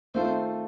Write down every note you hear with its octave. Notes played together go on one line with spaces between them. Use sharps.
D#3 A3 C4 F4 A4 C5